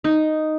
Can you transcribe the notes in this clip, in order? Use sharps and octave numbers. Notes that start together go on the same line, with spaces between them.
D#4